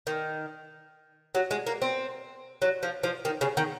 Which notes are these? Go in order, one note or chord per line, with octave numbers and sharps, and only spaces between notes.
D#3
F#3
G#3
A#3
C4
F#3
F3
F3
D#3
C#3
D#3